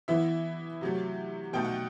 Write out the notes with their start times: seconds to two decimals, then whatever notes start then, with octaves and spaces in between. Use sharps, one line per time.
0.08 E3 B3 E4 E5
0.81 C3 F#3 A3
1.53 B2 A3 D#4 G5
1.65 F#5